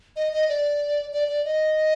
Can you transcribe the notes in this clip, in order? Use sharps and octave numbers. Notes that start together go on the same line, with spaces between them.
D#5
D#5
D5
D5
D5
D#5